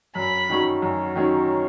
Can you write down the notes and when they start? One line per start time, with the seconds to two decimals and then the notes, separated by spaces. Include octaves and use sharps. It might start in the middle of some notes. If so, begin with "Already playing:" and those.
0.15 F#2 B5
0.49 D#3 F#3 C#4
0.82 F#2
1.15 D#3 F#3 C#4